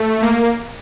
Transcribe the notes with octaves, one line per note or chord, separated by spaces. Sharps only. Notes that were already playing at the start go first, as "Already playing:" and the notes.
Already playing: A3
A#3